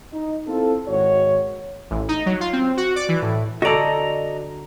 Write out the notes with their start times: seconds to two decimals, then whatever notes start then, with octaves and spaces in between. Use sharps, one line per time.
0.13 D#4
0.47 C4 E4 F4 A4
0.88 G#1 F#4 C#5
1.90 A1
2.08 D#4
2.26 F#3
2.41 F4
2.53 C4
2.77 F#4
2.96 D5
3.08 E3
3.22 A2
3.62 D3 F#4 A4 D5 D#5 A#5